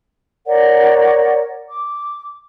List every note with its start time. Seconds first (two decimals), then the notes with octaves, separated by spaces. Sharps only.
0.46 A#4 C#5 D5 F#5
1.68 D6